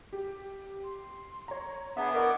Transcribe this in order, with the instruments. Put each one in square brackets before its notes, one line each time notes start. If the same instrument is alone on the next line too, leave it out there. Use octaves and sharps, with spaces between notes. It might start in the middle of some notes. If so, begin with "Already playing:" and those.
[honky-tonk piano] G4
[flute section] C6
[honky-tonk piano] C#5 A#5
[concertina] B3 [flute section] D4 G#4 B4 [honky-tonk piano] E5 A#5
[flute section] D4 E4 C#6 [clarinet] A#4 [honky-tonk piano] D#5 D6